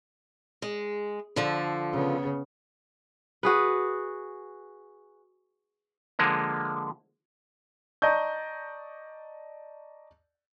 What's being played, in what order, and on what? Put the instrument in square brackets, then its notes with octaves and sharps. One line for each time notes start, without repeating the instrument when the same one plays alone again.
[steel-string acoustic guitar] G#3
D3 F3 A4
[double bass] C#3 B3
[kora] F#4 G#4 B4
[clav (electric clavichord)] D3 F3 G#3 A#3
[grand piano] D5 D#5 A5 A#5 C#6 G6